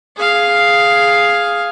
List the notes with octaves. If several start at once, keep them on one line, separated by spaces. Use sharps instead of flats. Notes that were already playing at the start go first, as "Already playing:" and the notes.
G#4 F5